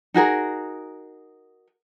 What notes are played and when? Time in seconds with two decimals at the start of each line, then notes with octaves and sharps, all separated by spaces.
0.14 D#4 F#4 G#4 A#4